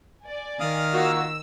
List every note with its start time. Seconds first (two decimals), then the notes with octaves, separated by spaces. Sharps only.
0.24 D5 G#5
0.60 D#3 F5 D#6 F6
0.93 A#3 F4 F#4 E6